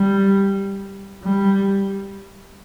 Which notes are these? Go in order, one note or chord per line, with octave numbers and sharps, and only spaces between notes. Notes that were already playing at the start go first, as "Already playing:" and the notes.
Already playing: G3
G3